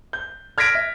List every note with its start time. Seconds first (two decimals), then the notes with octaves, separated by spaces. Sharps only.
0.13 G6
0.58 F6 G#6 A#6 B6 D7
0.75 E5